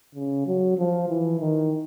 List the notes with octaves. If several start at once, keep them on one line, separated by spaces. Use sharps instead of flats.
C#3
F#3
F3
E3
D#3